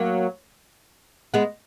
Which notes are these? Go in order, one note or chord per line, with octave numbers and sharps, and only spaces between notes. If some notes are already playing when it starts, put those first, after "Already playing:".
Already playing: F#3 A#3
G#3 B3